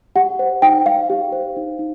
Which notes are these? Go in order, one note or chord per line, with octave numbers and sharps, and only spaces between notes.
G4 F#5
C5
D#4 G5
D#4 F5
G4
C5
D#4
D#4